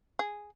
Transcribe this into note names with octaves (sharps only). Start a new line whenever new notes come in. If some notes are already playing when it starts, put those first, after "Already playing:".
G#4